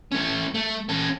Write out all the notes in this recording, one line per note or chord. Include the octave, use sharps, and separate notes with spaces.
A3 C#4
A3
C#4 A4